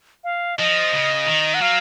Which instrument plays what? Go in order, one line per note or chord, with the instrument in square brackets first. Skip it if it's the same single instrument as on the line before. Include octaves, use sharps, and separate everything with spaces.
[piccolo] F5
[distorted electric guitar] F3 [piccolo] D#5
[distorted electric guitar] C#3
D#3
[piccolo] F#5
[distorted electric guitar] F#3 [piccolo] F5